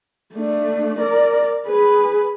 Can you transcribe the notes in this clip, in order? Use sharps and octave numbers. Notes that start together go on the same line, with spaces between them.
A3 D4
A#4 D5
G#4 B4